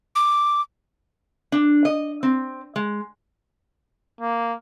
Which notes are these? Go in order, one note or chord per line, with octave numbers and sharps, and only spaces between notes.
D6
D4
D#5
C4
G#3
A#3